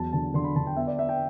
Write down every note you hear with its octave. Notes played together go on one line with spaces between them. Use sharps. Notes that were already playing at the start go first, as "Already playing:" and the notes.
Already playing: E2 F#3 A5
D3 A5
D3 C6
B5
D3 A5
G5
B3 E5
D5
B3 E5
G5